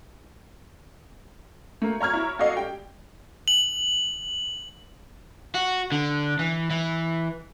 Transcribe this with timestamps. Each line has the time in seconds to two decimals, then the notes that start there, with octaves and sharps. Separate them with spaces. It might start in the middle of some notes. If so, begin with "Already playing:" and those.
1.82 A3 A#3
2.00 C#5 A#5 F6 G#6
2.13 E4 C#5 A#5
2.39 F#4 A4 D5 D#5 F5
2.56 G4 G5
3.48 F#7
5.54 F#4
5.92 D3
6.39 E3
6.70 E3